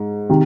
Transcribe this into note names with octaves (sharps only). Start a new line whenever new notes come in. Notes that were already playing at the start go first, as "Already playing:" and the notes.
Already playing: G#2
C3 D#3